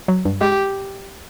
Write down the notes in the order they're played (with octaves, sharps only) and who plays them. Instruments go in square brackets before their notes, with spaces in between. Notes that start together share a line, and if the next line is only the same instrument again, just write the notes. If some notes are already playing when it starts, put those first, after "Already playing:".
[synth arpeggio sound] F#3
G2
[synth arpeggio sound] G#3 [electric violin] G4